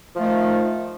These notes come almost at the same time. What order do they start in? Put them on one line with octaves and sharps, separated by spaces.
F3 A3 D#3